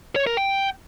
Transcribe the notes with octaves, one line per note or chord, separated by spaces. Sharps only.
C#5
A#4
G5